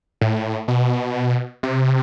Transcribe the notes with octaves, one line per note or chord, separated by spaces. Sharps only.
A2
B2
C3